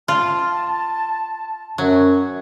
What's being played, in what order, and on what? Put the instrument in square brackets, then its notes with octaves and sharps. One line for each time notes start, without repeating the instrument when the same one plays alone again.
[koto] F4 [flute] A5
[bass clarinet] F#2 [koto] F#3